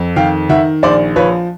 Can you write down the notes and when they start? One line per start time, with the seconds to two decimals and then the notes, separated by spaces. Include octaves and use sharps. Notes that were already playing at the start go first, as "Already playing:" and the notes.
Already playing: F2
0.16 D#3 F5 G5
0.49 D#3 E5 F#5
0.83 A#1 C5 D5
1.16 F3 B4 C#5